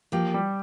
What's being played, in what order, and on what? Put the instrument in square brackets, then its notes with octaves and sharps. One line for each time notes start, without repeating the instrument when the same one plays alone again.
[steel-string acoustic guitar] F3 A#3 [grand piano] G4
[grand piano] G3